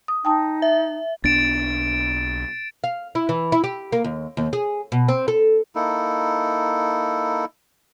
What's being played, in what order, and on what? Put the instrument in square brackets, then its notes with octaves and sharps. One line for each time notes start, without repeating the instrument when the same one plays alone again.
[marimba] D#6
[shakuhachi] D#4 [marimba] G5 A5 D#6
[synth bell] E5
[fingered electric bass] B1 B3 D4 [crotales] A6 D7 E7
[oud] F5
E4
E3
E4
G4
A#3
D#2
D#2
G#4
B2
C4
A4
[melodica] A#3 D#4 E4 A4